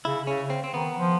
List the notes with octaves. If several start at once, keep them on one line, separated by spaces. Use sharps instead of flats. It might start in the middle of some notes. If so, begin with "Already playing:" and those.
C#3 E4
C#3 C#4
C4
C4
D#3 B3
F3